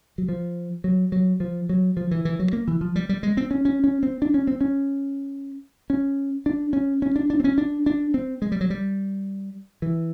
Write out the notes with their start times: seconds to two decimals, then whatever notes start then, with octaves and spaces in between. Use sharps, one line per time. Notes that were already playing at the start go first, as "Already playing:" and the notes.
0.18 F#3
0.29 F3
0.84 F#3
1.12 F#3
1.40 F3
1.69 F#3
1.97 F3
2.11 E3
2.25 E3
2.39 F#3
2.53 A#3
2.68 E3
2.81 F3
2.96 G3
3.09 G3
3.23 G#3
3.37 C4
3.51 C#4
3.65 C#4
3.84 C#4
4.03 C4
4.22 D4
4.34 C#4
4.47 C4
4.61 C#4
5.90 C#4
6.46 D4
6.73 C#4
7.02 C#4
7.16 D4
7.30 D4
7.40 C4
7.44 C#4
7.58 D4
7.86 D4
8.14 C4
8.42 G#3
8.52 G3
8.61 F#3
8.70 G3
9.82 E3